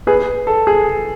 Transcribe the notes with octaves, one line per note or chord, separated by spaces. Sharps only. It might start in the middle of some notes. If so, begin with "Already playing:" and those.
G#4 B4
A4
G#4